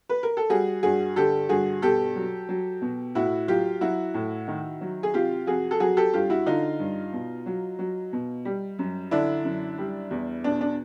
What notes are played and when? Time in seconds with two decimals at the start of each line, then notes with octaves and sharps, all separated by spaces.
0.09 B4
0.23 A#4
0.37 A4
0.50 G3 F#4 G#4
0.83 G2 F#4 G#4
1.16 D3 G4 A4
1.49 G2 F#4 G#4
1.82 B2 G4 A4
2.16 F#3
2.49 F#3
2.82 B2
3.15 A2 E4 F#4
3.48 F#3 F4 G4
3.81 F#3 E4 F#4
4.14 A2
4.48 D#3
4.81 F#3
5.03 G#4
5.14 C3 F4 G4
5.47 F2 F#4 G#4
5.71 A4
5.80 F#3 F#4 G#4
5.97 G4 A4
6.13 G2 F4 G4
6.30 E4 F#4
6.46 D3 D#4 F4
6.79 G2
7.13 B2
7.46 F#3
7.79 F#3
8.13 B2
8.45 G3
8.79 F#2
9.11 D3 D4 E4
9.45 F#2
9.78 G3
10.11 E2
10.44 B2 D4
10.61 D4